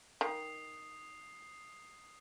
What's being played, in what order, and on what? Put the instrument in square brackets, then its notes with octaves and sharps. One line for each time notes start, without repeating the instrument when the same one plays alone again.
[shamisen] D#3 [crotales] D#6 C7